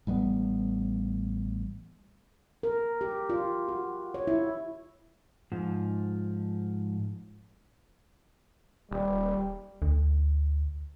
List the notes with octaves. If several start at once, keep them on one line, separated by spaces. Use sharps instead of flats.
A1 G3 G#3 B3
A#4
G4
F4
F#4
C#5
E4
G#2 F3
D#1 G3
D2